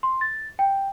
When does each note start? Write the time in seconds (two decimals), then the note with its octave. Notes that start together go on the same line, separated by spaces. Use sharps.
0.03 C6
0.21 A6
0.59 G5